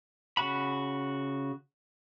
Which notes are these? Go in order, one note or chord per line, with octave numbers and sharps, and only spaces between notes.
C#3 F#4 F#5 B5